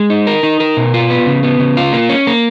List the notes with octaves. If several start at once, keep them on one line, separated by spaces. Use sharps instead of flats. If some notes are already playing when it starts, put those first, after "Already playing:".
Already playing: G#3
D#4
A#4
D#4
A#4
B2
F4
B3
C#3
B3
C#3
F4
A#3
C#4
A#3